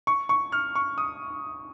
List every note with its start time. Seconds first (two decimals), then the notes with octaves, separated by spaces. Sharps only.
0.07 C#6
0.29 C#6
0.52 F6
0.75 C#6
0.98 D#6